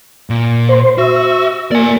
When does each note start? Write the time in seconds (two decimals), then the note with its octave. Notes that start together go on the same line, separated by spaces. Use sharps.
0.30 A#2
0.69 C5
0.98 F#4 E5
1.72 A#3 D5 G#5